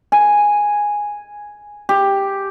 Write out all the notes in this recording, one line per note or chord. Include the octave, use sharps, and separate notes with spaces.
G#5
G4